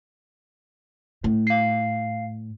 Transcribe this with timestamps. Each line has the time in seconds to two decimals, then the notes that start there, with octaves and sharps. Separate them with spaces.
1.24 A2
1.47 F5 C7